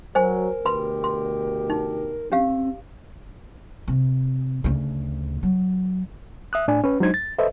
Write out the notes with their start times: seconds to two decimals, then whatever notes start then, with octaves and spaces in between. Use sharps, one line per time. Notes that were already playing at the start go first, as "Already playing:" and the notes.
0.15 F#3 A#4 C5 G#5
0.65 D2 B2 G4 B4 B5 C6
1.04 C6
1.70 D#4
2.32 C4 C#4 G4 F5
3.88 C3
4.64 D2 C#3
5.43 F#3
6.53 E5 D#6 F#6
6.68 A2 D4 D5 G#5
6.84 C#4 B4
7.00 F#3 G#3 D4 D#4 C5 G#6
7.14 A6
7.38 A4 B4 C5 D#5 E5